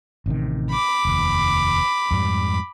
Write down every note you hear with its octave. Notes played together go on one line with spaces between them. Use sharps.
A1 C3 D#3
B5 D6
F1 D#2
F2 G#2 G3